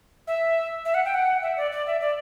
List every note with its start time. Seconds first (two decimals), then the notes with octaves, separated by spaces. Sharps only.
0.27 E5
0.85 E5
0.94 F#5
1.05 G5
1.14 F#5
1.42 E5
1.57 D5
1.72 D5
1.87 E5
2.01 D5